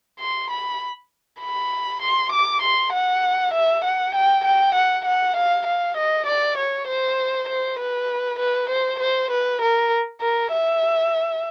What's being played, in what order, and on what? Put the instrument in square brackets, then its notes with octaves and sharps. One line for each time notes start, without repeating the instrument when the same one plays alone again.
[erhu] C6
B5
B5
C6
D6
C6
F#5
E5
F#5
G5
G5
F#5
F#5
F5
F5
D#5
D5
C#5
C5
C5
B4
B4
C5
C5
B4
A#4
A#4
E5